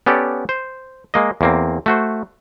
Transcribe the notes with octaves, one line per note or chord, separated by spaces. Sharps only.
B3 C#4 G4 A4 D5
C5
G#3 A#3 D#5
E2 A#3 C4
A3 F#4 C5